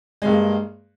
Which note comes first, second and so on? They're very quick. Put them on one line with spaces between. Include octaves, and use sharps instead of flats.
G#3 G2 A#3